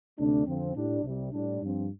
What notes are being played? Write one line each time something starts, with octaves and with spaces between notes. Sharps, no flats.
D2 C3 A3 D4
F2 D3 F3 C4
A2 G3 D4
C2 C3 G3
A2 G3 D4
G2 F3 C4